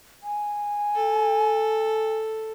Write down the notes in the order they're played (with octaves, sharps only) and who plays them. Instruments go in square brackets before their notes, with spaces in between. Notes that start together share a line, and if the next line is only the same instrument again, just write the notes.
[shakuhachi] G#5
[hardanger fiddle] A4